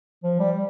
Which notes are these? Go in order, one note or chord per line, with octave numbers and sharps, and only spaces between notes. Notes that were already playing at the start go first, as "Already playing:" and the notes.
F3
G3